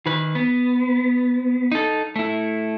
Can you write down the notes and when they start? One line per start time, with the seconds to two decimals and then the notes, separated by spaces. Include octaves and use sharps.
0.06 D#3 B4
0.35 B3
1.72 D#4 A4
2.16 A3 E4